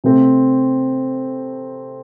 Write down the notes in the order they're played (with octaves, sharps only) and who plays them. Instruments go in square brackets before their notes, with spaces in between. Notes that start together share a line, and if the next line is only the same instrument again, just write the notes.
[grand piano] C3 A3 C4